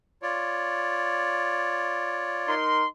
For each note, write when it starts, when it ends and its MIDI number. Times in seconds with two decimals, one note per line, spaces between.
0.22 2.55 65
0.22 2.55 73
0.22 2.55 74
2.48 2.87 63
2.48 2.87 70
2.48 2.87 84